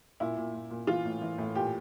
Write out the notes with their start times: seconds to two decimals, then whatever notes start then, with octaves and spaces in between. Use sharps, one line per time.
0.20 A#2 E4
0.37 A#2
0.54 A#2
0.70 A#2
0.87 E3 F4
1.05 A2
1.21 E3
1.38 A2
1.55 A#2 G4